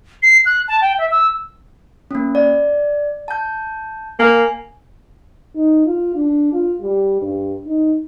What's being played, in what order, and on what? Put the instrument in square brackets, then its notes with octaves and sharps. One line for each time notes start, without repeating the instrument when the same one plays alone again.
[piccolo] C7
F#6
A5
G5
E5
E6
[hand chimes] A#3 C#4
D5
A5 G6
[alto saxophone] A#3 [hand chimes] G#5
[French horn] D#4
F4
D4
F4
G3
G2
D#4